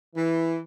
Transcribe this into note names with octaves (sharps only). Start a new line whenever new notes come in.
E3